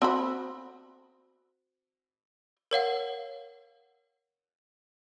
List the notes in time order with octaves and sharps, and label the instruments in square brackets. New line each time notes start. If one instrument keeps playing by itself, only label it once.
[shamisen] C4 F#4 B5
[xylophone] A#4 C#5 F5 F#5